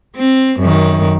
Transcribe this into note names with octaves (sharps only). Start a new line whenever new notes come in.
C4
F#2 D#3